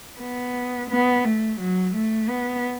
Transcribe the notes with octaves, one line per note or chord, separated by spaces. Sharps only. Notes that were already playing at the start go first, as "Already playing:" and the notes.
B3
B3
A3
F#3
A3
B3